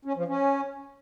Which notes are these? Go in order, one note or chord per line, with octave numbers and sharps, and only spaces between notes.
C#4
F3
C#4